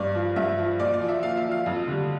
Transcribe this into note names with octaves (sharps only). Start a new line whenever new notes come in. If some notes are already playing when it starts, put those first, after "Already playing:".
Already playing: G2 D5
F3
G2 E5
F3
A#2 D5
D5
F3
E5
A#2 F5
E5
F3
F5
F2
D3 G3